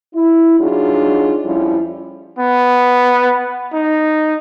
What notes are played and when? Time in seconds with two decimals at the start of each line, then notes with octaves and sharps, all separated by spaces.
0.15 E4
0.60 F#3 D4 D#4 F4 F#4 G#4
1.45 F2 F3 G3 C#4 E4
2.39 B3
3.73 D#4